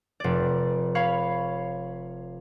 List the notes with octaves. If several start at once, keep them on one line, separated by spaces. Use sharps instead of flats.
F1 D5
C#5 F5 B5